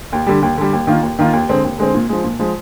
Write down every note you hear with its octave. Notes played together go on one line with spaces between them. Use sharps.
D#2
D3 G3
D#2
D3 G3
D#2
D#3 A#3 F4
D#2
D#3 A#3 F4
D#2
D3 G#3 C4
D#2
D3 G#3 C4
A#2
F3 G#3
A#2
F3 G#3